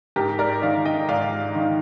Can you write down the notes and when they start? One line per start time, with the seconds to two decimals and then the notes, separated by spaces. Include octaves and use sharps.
0.16 G#2 G4 A#4
0.39 A#4 D5
0.62 D#3 D5 F5
0.85 D#5 G5
1.08 G#2 D5 F5
1.55 D#3